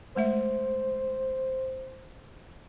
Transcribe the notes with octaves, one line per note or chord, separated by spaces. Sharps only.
G#3 A3 C5 E5